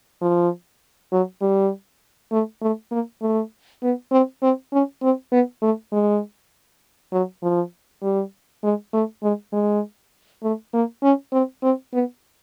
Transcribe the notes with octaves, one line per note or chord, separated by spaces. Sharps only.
F3
F#3
G3
A3
A3
A#3
A3
B3
C4
C4
C#4
C4
B3
A3
G#3
F#3
F3
G3
G#3
A3
G#3
G#3
A3
A#3
C#4
C4
C4
B3